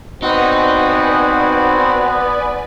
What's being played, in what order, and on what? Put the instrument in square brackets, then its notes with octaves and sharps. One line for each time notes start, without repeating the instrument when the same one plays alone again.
[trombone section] B3 [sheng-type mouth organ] C4 F#4 [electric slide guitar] D#4 [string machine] B4 D5 G#5